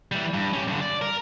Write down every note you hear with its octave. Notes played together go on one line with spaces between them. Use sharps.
E3 G3
G2
C#4 G4
G2 D3
D5
A#4